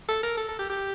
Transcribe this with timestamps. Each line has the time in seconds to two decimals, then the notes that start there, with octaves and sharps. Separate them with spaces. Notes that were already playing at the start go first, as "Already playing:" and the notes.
0.09 A4
0.23 A#4
0.37 A4
0.49 A4
0.59 G4
0.70 G4